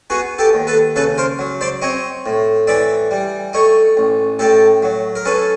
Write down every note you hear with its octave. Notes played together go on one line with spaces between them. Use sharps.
B3 F#4 G#4
G4 A4
D#2
A4 B4
C#3 A4 B4
A#4 C5
F#3
C5 D5
C4 C#5 D#5
A2
E3 D5 E5
G3
A3 C#5 D#5
A1
A2 G4 A4
F#3
A#4
C#4 A4 B4